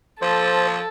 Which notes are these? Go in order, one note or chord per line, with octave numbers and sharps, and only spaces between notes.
F3 A4 C5